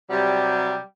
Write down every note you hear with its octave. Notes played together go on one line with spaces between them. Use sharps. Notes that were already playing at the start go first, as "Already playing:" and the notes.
C3 F#3 G3